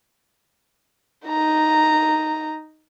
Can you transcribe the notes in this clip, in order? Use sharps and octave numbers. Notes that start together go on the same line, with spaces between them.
D#4 A#5